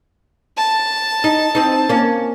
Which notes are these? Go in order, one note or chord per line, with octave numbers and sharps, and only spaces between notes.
A5
D#4
C4 D#4
A#3 C#4